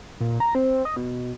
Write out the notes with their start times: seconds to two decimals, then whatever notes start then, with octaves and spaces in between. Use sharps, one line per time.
0.20 A#2
0.40 A#5
0.55 C4
0.85 D#5
0.96 B2